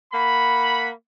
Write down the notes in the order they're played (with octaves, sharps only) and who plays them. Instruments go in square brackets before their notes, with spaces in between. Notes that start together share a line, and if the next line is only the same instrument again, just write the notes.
[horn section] A#3 F#5 B5